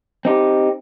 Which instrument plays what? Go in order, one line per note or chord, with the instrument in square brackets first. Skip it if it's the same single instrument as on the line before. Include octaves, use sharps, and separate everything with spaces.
[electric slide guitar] C4 D#4 G4